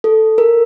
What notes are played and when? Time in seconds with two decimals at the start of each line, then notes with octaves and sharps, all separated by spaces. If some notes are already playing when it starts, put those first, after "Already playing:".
0.04 A4
0.38 A#4